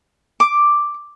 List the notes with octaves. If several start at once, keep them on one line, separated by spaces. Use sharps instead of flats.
D6